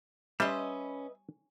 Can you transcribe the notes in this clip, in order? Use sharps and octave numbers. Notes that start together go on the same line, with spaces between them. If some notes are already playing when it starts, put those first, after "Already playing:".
G3 C#4 B4 D#5 E5 C6